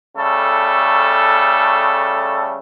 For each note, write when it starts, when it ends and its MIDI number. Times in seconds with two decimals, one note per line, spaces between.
0.16 2.59 49
0.16 2.59 55
0.16 2.59 57
0.16 2.59 69